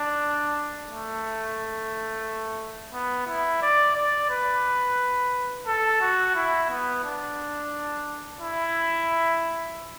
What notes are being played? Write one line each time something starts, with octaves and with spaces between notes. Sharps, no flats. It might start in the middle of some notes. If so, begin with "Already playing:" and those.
Already playing: D4
A3
B3
E4
D5
D5
B4
A4
F#4
E4
B3
D4
E4